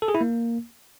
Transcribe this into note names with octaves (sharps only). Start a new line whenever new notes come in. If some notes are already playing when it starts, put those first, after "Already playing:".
A4
G#4
E4
A#3